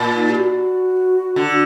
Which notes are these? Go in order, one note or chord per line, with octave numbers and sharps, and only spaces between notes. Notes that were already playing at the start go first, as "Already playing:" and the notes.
Already playing: A#2
D#4
G4
F#4
D3